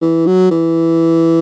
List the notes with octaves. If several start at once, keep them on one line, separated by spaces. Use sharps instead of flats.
E3
F#3
E3